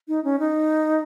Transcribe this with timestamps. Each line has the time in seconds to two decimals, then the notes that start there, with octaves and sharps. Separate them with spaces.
0.08 D#4
0.24 C#4
0.40 D#4